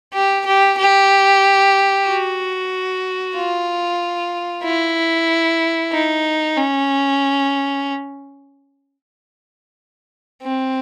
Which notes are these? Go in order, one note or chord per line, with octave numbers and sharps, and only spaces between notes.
G4
G4
G4
F#4
F4
E4
D#4
C#4
C4